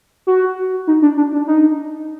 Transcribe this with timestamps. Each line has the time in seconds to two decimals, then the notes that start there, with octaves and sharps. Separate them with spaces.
0.27 F#4
0.87 D#4
1.02 D4
1.17 D4
1.32 D4
1.47 D#4